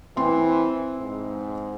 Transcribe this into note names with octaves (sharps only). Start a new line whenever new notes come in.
E3 C4 B4 C6
G#2